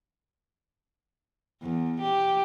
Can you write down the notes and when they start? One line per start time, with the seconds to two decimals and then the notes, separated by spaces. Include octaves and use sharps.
1.63 E2
2.01 G4